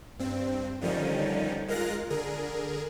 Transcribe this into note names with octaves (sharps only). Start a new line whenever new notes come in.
G2 C4
D3 D#3 F3 G3 C#4 D#4
G#3 F4 A#4 F5 F#6 A#6
D3 G#4 A#4